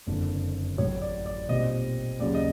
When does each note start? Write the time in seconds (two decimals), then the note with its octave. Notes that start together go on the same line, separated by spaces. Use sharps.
0.07 F#1 F2 D3
0.78 A1 A2 F#3 C#5
1.02 D5
1.26 D5
1.48 B1 A#2 G3 C4 D#5
2.19 D#2 C#3 F#3 D5
2.35 D#5